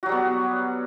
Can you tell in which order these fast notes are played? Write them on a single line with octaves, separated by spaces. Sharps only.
F#4 F#3 G3 B3